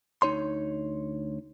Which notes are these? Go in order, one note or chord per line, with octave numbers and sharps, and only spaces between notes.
D2 D#4 C#5 C6